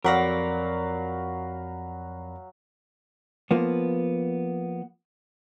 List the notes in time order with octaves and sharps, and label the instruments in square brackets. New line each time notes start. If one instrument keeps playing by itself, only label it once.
[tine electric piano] F2 B5 A#6 [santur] F#3 F5 [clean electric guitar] A#4 D5
[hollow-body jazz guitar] F3 A#3 B3